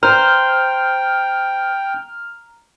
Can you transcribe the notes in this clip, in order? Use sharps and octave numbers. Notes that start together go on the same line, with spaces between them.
C5 G5 A#5 F6